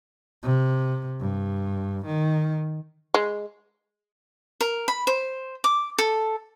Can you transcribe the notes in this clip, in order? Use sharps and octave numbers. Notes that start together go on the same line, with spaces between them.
C3
G2
D#3
G#3
A#4
B5
C5
D6
A4